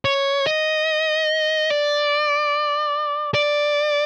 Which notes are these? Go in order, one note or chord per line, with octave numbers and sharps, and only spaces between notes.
C#5
D#5
D5
D5